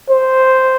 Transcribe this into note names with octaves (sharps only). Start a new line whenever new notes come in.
C5